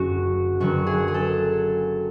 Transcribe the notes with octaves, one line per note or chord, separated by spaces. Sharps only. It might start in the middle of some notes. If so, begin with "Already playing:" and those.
Already playing: F#1 F#2 D3 F#4
F#1 F#2 D3 F#3 F#4
G#4
G#4
A4